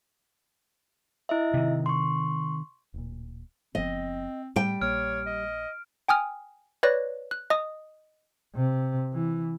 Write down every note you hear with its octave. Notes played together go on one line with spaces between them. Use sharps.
E4 D#5 E5
C3 D#3
C6 C#6
D1 A#2
F#1 F3 B3 C4 D#5
A2 G3 G5
A#1 A#3 C#5 F6 D7
D#5
G5 G#5 D#6 F6
B4 C#5 D5 F#6 A#6
F#6
D#5 D#6
C3
E3